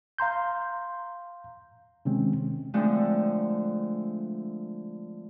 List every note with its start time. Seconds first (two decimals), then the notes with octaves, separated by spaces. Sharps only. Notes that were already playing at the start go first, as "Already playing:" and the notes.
0.18 F5 A#5 C6 G6
2.05 C3 D#3 G#3 C4 C#4
2.74 D3 F3 G#3 A3 C4 D4